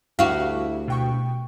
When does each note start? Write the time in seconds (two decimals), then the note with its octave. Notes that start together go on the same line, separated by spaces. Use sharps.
0.19 D2 E4 F#4 G4 E5 F5
0.88 B2 G5 C#6